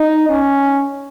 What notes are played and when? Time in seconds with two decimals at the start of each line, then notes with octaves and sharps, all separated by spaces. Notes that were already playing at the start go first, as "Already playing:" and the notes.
Already playing: D#4
0.29 C#4